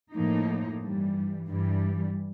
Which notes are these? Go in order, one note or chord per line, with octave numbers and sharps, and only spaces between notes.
A2 F3 A#3 D#4
G2 E3 G3
G2 E3 G3